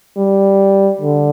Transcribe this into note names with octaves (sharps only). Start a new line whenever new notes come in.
G3
D3